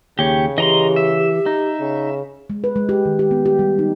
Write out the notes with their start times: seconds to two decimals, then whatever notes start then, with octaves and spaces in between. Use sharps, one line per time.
0.19 D#2 C#3 G4 C#5
0.58 E3 G4 D#5 A#5 C6
0.96 E5
1.46 D#4
1.80 C#3
2.50 G#3
2.64 B4
2.76 G#3
2.89 G4
3.05 D#3
3.19 G4
3.31 B3
3.46 G4
3.59 G3
3.79 D#4